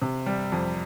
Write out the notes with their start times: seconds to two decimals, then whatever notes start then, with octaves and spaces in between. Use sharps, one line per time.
0.02 C3
0.26 G3
0.52 F2